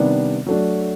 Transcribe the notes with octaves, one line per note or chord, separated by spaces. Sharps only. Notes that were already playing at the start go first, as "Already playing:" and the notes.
Already playing: C3 D#3 G3 B3 D4
F#3 A3 D4